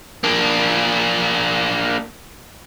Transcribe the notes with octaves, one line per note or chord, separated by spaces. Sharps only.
A#3 D4